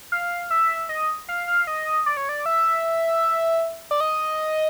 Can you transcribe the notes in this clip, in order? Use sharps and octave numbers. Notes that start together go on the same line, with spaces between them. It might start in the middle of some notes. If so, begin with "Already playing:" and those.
F5
E5
D#5
F5
F5
D#5
D5
C#5
D5
E5
D5
D#5